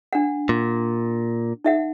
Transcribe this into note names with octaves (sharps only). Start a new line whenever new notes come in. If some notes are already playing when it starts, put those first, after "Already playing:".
D4 F#5
A#2
D#4 E5 F#5